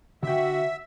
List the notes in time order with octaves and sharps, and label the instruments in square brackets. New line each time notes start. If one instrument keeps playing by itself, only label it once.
[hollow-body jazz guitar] D3 G5 [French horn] F#4 [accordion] E5